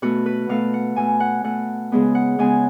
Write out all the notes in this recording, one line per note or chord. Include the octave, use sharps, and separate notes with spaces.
B2 A3 F#4
B4
B2 A3 F5
F#5
B2 A3 G#5
F#5
B2 A3 F#5
C#3 G#3 B3
F#5
C#3 G#3 B3 G#5